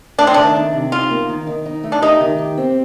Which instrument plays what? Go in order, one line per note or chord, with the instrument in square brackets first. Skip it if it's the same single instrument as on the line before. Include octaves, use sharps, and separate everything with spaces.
[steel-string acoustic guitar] A3 [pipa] D4
[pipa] C4
[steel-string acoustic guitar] D#3 [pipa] D4
[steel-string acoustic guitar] D4
C3
[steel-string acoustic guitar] D#4 [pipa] F4
[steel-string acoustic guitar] A#3
D#3
D#3
D#4
A3
[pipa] D4
[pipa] D#4 [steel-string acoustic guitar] G4
[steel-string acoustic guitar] D#3
G4
C4